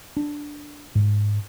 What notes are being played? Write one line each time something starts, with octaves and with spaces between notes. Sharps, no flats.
D4
G#2